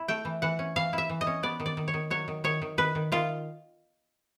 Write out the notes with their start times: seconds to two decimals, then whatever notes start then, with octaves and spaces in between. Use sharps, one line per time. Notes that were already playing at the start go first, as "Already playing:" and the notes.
Already playing: E4
0.08 A3 G5
0.25 E3
0.42 E3 F#5
0.59 C#4
0.76 E3 F5
0.93 E4 E5
1.09 E3
1.21 D#5
1.27 C#4
1.43 B3 D5
1.60 D#3
1.66 D5
1.77 D#3
1.88 C#5
1.94 D#3
2.10 F#3 C#5
2.28 D#3
2.44 D#3 C#5
2.62 D#3
2.78 D#3 B4
2.95 D#3
3.12 D#3 F4